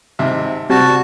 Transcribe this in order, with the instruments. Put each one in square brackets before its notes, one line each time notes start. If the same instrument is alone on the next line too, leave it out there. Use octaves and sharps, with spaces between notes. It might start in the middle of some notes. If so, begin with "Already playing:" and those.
[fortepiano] G#1 C3 E5
[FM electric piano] C3 [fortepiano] G3 [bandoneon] F#4 A5